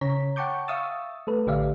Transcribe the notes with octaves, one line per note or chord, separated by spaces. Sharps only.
C#3 C#5 A#5 B6
F#5 G5 A5 C#6 D6 G6
E5 F5 C#6 D#6 E6 A6
A3 A4 B4
A1 D3 G4 D5 E5 F5